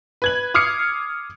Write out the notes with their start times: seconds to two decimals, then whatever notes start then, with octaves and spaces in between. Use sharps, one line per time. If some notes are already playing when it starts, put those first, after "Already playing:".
0.22 B4 G#6 F#7
0.54 D6 D#6 F6 G#6 C7 C#7